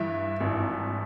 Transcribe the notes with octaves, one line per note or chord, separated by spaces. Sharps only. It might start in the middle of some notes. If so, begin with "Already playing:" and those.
Already playing: G2 E3 E5
G#1